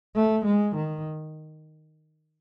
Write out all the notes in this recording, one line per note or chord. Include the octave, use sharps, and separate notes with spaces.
A3
G#3
D#3